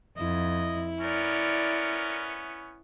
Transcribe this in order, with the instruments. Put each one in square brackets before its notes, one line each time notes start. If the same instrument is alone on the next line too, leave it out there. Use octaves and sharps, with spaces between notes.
[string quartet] F2 [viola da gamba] E4 [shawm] D#5
[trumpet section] B3 C#4 [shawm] A#4 [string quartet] D5